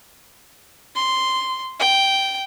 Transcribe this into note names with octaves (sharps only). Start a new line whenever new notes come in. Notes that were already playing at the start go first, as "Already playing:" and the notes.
C6
G5